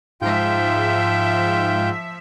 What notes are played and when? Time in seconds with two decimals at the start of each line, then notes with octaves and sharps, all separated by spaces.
0.22 G#2 F3 F4 E5 G5